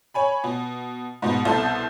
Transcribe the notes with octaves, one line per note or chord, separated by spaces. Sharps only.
C#5 G#5 B5
B2
G#2 B2
C2 B2 C4 A4 A5 G6